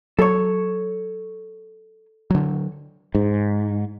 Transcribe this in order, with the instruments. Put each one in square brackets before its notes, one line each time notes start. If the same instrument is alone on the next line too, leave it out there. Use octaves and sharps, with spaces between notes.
[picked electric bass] F#3 [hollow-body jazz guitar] A4 C#5
[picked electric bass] D3 F#3
[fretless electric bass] G#2